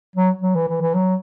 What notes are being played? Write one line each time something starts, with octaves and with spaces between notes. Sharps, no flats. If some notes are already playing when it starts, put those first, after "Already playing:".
F#3
F#3
E3
E3
E3
F#3